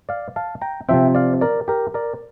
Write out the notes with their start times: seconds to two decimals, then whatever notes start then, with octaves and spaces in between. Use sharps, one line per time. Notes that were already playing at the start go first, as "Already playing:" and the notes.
0.09 D5 F5
0.36 F5 A5
0.62 G5 A#5
0.89 C3 F3 C4 E5 G5
1.15 D5 F5
1.41 A#4 D5
1.68 G4 A#4
1.94 A#4 D5